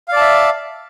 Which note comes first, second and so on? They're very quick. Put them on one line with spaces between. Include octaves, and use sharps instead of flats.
F5 D5 A5 E5